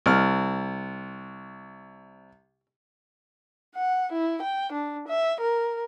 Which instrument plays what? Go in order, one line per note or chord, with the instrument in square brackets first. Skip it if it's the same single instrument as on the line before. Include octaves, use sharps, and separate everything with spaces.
[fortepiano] C2 F6
[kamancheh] F#5
E4
G5
D4
E5
A#4